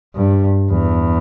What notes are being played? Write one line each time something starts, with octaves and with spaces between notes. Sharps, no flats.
G2
E2